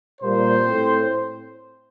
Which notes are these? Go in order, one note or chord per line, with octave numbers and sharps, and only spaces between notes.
A#2 G3 A#3 C5
A2 A3 C4